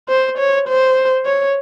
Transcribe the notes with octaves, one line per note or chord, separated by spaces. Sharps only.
C5
C#5
C5
C#5